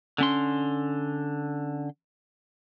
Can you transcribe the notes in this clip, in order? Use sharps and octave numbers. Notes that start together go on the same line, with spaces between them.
D3 C#4 C6